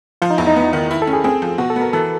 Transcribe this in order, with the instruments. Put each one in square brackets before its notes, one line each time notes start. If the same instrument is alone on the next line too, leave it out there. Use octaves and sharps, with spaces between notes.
[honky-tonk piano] F3 [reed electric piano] F4
[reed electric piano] D#4
[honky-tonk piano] E2 [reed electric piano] E4
[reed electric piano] D#4
[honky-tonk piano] B3
D#3
E4
[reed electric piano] A4
[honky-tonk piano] C#4
[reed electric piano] G#4
[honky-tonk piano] C4 [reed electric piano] G#4
[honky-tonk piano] F3
[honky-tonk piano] B2 [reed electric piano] F#4
[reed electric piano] A4
[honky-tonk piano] B3
[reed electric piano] A#4
[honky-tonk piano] E3 [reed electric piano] A4